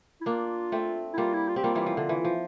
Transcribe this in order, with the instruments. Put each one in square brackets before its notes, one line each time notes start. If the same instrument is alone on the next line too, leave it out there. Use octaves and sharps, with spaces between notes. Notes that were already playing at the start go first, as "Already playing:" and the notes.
[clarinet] E4
[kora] A#3 D4 [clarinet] F4
[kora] A3 C4
[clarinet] E4
[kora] G3 A#3 [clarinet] F4
[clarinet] E4
F4
[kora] C4 [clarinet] G4
[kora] G3 A#3 [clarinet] F4
[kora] E3 G3
F3
D3
E3
F3